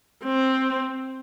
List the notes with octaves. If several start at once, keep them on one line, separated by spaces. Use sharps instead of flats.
C4